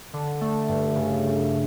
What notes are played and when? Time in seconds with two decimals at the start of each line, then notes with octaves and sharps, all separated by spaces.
0.14 D3
0.41 A3
0.69 G2
0.96 C#3